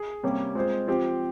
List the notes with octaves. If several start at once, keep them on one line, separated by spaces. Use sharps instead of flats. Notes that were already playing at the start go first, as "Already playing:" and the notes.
Already playing: G#4
C3 G3 A#3 C#4 G4
G#3 C4 F4 G#4 C5
F3 C4 G4